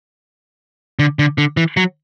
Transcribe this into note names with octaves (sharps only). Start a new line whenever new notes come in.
D3
D3
D3
E3
F#3